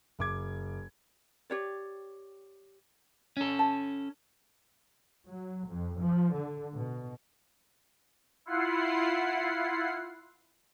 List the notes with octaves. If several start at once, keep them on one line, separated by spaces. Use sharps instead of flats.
F#1 D6 G#6
G4 C#5 D5
C#4 A4
A5
F#3
F2
F3
D3
B2
E4 F4 F#5 C7